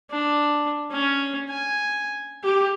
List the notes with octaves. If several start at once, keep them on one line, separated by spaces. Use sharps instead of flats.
D4
C#4
G#5
G4